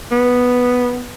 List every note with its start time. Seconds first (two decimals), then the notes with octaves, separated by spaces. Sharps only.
0.11 B3